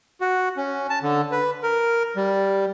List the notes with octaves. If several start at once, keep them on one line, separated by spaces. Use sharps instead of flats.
F#4
C#4
A5
D3
B4
A#4
G3